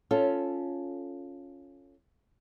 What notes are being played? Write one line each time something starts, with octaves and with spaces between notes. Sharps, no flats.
C#4 F4 A4